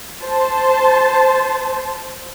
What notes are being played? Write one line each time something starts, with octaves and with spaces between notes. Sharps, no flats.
C5 A5